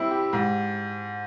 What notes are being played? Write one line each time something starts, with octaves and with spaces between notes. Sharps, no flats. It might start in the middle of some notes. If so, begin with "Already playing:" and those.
Already playing: G3 C4 E4
G4
G#2